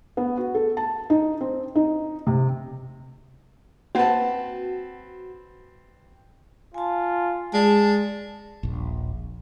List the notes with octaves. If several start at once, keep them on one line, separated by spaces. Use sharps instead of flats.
B3
F#4
A4
A5
D#4
C4
D#4
C3
A#3 C4 F#4 B4 F#5 A5
F4 G#5 A5
G#3 D5 A5
D#1 A#1